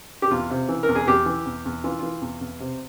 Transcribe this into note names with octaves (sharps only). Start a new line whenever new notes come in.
G4
E2 F4
C3
E3
A#4
E2
G#4
E2 G4
E3
E2
E2
E3 F4
E3 F4
E2
E2
C3